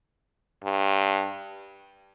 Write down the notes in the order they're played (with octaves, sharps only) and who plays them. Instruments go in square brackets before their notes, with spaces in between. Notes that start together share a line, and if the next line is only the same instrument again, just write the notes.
[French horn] G2